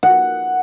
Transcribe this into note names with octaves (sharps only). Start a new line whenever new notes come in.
F#5